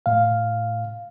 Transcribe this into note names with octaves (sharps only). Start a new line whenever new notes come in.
A2 F5